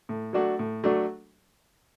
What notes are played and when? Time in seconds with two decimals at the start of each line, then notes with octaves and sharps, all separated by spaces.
0.09 A2
0.33 F#3 A3 D4 F#4
0.59 A2
0.84 F#3 A3 D4 F#4